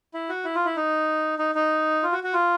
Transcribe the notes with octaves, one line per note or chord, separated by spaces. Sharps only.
E4
F#4
E4
F4
E4
D#4
D#4
D#4
F4
F#4
F#4
F4